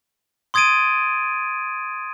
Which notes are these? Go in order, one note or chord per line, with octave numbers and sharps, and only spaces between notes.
C6 D#6 G#6 A6 D7 D#7